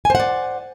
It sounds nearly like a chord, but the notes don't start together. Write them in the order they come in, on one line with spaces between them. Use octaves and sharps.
G#5 C5 F#5 D5